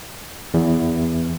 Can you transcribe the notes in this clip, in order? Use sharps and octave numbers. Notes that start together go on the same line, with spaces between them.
E2